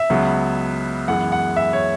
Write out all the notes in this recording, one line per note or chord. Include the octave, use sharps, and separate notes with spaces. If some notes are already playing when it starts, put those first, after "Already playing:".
Already playing: E5
C#2 C#3 F#3 B3
F#2 E3 G#3 B3 F#5
F#5
E5
C#5